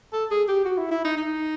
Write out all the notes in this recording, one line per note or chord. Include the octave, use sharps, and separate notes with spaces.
A4
G#4
G4
F#4
E4
E4
D#4
D#4